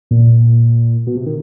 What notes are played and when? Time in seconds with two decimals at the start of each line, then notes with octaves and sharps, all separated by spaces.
0.11 A#2
1.07 B2
1.16 C3
1.26 D#3